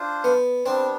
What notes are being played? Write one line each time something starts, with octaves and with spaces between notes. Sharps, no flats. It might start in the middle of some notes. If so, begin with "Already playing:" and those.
Already playing: D4 F4 C5
B3
G3 B3 C4 D4